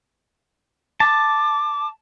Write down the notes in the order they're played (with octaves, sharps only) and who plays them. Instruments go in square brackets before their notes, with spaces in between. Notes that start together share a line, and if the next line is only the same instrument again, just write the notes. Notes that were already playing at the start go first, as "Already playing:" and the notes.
[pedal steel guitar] A5 [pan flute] D6